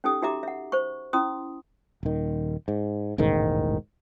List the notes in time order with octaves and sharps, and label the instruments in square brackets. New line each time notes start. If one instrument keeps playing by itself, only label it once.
[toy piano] C#4 D#4 G4 A4 D#6
D#4 F#4 G4 E5 A#5 D6
E5 F#5
C5 C#6
C#4 E4 C6 D#6
[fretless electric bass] D#1 D#3
G#2
E1 A1 G#2 D#3